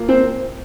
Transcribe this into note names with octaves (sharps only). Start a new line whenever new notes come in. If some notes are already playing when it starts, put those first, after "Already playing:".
Already playing: F3 A#3
C4 C5